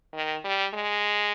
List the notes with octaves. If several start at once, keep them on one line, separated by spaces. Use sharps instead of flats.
D#3
G3
G#3